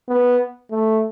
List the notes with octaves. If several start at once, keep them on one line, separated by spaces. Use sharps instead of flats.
B3
A3